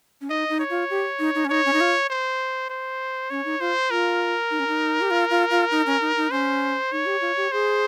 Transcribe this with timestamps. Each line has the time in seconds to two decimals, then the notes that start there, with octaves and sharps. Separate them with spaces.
0.21 C#4
0.30 D#4 D#5
0.49 D#4
0.59 C#5
0.70 F4
0.90 G4
1.19 D#4
1.35 D#4
1.45 C#4
1.50 D#4 C#5
1.66 C#4
1.73 D#4
1.81 F4
2.10 C5
2.70 C5
3.30 C#4 C#5
3.45 D#4
3.60 F4 C5
3.90 F4 A#4
4.51 D#4
4.59 C#4
4.68 D#4
5.01 G4
5.11 F4
5.30 F4
5.50 F4
5.71 D#4
5.86 C#4
6.01 D#4
6.17 D#4
6.31 C#4 C5
6.92 D#4 C#5
7.06 G4
7.21 F4
7.37 G4
7.52 G#4 C5